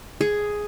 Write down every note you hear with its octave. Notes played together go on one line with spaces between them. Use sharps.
G#4